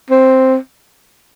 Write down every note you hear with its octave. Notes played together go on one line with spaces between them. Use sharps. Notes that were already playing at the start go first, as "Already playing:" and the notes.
C4